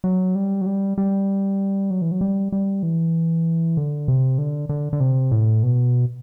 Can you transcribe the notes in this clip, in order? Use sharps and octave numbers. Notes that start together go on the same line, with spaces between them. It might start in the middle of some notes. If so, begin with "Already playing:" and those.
F#3
G3
F#3
G3
G3
F#3
E3
F#3
G3
G3
E3
D3
C3
D3
D3
D3
C3
A2
B2